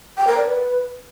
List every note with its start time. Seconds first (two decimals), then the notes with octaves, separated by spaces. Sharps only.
0.17 G5
0.27 A#4
0.37 D5
0.47 B4